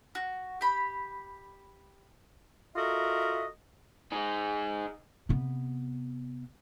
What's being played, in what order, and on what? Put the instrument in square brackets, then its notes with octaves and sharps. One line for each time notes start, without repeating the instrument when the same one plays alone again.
[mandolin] F#4
G4 B5
[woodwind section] F4 F#4 A4 A#4 D#5 E5
[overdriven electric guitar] D#4 G#4
[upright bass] C3 B3